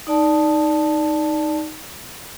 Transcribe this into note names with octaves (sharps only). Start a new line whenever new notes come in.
D#4 D5 A5